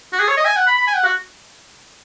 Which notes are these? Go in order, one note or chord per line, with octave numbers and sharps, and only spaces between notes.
F#4
G#4
C#5
D#5
G#5
F#5
B5
B5
G#5
F#5
F#4